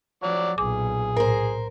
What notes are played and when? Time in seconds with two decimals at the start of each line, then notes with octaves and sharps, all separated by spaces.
0.23 F3 F#3 D5
0.58 B1 A#2 G#4 D6
1.17 A2 A#4 C5